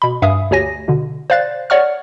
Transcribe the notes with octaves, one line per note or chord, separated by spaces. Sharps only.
B2 B5
G2 E5 F5 G#5 D#6
D2 G4 C#5 G#5 A#6
B2 D3
C5 D5 F5 F#6 A6
C#5 D5 F#5 C#6 F6